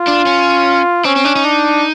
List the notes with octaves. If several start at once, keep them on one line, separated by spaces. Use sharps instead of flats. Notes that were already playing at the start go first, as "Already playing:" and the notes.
Already playing: F4
D4
C#4
C4 C#4
C4
D4
D#4
D4